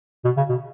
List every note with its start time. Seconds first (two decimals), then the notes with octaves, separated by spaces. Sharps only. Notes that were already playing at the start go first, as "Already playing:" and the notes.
0.25 B2
0.37 C#3
0.49 B2